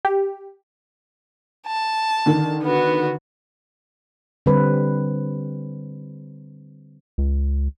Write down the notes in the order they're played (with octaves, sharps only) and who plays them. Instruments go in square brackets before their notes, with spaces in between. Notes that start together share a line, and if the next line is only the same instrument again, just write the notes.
[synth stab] G4
[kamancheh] A5
[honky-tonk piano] D3 D#3
[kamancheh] B3 F#4
[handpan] D3 G3 C4 B4
[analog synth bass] C#2